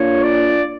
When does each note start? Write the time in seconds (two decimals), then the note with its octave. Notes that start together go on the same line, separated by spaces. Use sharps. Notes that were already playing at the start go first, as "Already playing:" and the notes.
Already playing: A#3 D4 F4 C#5
0.23 D5